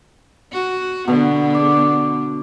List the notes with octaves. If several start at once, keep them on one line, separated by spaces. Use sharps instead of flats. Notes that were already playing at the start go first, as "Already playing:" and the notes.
F#4
B2 D3 B3
D5